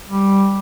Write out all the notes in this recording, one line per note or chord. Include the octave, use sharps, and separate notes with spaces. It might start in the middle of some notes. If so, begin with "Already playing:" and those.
G3